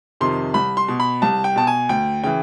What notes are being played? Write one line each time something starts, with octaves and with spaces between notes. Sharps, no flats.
F2 C3 D#3 C6
C2 B5
C6
B2
B5
C2 A5
G5
B2 A5
G#5
D2 G5
C#3 E3 G5